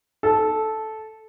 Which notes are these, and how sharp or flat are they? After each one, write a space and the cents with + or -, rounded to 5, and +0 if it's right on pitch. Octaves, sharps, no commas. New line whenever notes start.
A4 -10